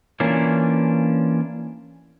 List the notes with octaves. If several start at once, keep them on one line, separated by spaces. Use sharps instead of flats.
E3 A#3 C#4 D4 F4